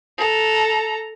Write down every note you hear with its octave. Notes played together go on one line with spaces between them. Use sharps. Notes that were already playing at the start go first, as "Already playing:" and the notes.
A4 A#5